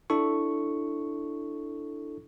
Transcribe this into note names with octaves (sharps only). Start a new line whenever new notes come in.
D4 E4 A4 C#6